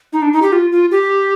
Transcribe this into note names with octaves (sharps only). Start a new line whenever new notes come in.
D#4
D4
D#4
G4
F4
F4
G4